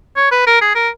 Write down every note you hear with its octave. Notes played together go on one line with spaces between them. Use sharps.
C#5
B4
A#4
G#4
A#4